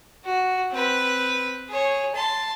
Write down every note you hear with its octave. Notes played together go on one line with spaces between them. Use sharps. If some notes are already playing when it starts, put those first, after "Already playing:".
F#4
C4 B4
G#4 C#5
A5 C6